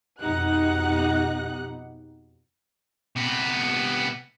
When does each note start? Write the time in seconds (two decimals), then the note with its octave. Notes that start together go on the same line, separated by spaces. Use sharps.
0.20 F2 B2 D#4 G4 F#5 F#6
3.16 C3 B3